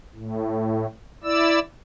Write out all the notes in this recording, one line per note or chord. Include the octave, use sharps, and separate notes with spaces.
A2
E4 D5 E6